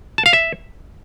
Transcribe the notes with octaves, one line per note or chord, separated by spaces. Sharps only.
A5
F5
E5